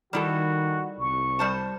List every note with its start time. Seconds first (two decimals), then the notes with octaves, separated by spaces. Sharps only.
0.13 D#3 G3 E4 F#4 A4
0.98 C2 C#6
1.39 G3 C5 A5